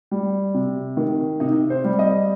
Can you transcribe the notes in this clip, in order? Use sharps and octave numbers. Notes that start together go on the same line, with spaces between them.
G3
C3
D#3
C3 D#4
C5
G3
D#5